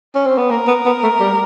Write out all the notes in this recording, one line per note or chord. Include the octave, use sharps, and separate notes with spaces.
C#4
C4
B3
A#3 A#4
B3
B3
A3
G3